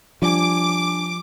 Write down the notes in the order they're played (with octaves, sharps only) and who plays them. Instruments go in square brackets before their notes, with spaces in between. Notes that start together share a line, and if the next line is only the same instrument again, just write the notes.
[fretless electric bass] F3 G3 [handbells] D4 G#5 [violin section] D6